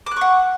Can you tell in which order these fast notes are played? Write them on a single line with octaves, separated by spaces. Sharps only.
D6 F#6 C#6 F#5